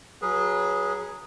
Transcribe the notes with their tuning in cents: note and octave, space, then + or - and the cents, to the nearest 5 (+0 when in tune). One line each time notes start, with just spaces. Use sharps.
F#3 +0 G#4 +0 B4 -30